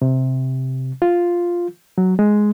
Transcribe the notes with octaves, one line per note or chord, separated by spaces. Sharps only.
C3
F4
F#3
G#3